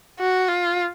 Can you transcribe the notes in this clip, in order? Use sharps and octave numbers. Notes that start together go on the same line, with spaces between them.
F#4
F4